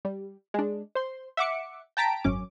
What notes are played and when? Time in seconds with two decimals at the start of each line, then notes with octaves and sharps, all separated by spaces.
0.05 G3
0.54 G#3 D4
0.95 C5 C6
1.37 E5 F#5 D6 C#7
1.97 G5 A5 A#5 B6 D7
2.24 G#1 F#2 C#4 D6